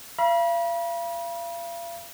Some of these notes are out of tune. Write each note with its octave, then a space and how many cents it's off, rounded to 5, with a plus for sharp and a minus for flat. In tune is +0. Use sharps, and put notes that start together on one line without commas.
F5 -40 B5 -40